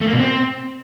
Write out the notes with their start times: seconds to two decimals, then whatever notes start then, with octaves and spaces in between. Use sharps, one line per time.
0.01 A3
0.07 A#3
0.13 B2
0.19 C4